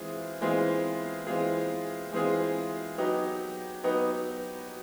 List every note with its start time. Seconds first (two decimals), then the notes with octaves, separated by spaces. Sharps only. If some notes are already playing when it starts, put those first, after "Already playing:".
Already playing: E3 G#3 C4 F4 G#4
0.41 E3 G#3 C4 F4 G#4
1.27 E3 G#3 C4 F4 G#4
2.13 E3 G#3 C4 F4 G#4
2.98 F#3 B3 D#4 G4
3.84 F#3 B3 D#4 G4